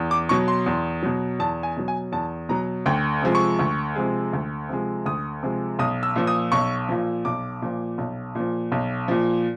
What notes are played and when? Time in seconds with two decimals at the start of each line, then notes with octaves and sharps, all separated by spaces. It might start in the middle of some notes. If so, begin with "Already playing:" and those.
Already playing: E2
0.11 D6
0.29 B2 F#3 C#6
0.48 C6
0.66 E2
1.03 B2 F#3
1.39 E2 A5
1.63 G#5
1.76 B2 F#3
1.88 G#5
2.12 E2 A5
2.49 B2 F#3 A#5
2.86 D2 G5
3.22 C3 F3 G#3
3.35 C#6
3.59 D2
3.95 C3 F3 G#3
4.33 D2
4.69 C3 F3 G#3
5.06 D2 D#6
5.43 C3 F3 G#3
5.79 B1 D#6
6.03 E6
6.16 A#2 F3
6.27 D#6
6.52 B1 C#6
6.89 A#2 F3
7.25 B1 D6
7.62 A#2 F3
7.98 B1
8.35 A#2 F3
8.72 B1
9.08 A#2 F3